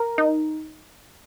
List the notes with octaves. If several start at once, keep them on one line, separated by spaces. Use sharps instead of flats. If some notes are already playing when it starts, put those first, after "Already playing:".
Already playing: A#4
D#4